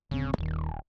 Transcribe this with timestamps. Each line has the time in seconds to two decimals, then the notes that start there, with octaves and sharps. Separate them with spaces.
0.11 D1 C#3 C4
0.38 D#1 D#2 D#3